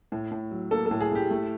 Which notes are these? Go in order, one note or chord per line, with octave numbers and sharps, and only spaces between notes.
A2
A2
F#3
A#3 A4
A4
A2
G#4
A2 G4
A3